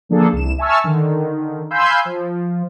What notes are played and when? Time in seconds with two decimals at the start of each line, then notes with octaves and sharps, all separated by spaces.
0.09 D3 F3 A#3 D4 G#4 A4
0.33 C2 E7
0.58 E5 G#5 A5 C#6 E6 F6
0.84 D3 D#3
1.71 F5 G#5 B5 C6 E6 G6
2.05 F3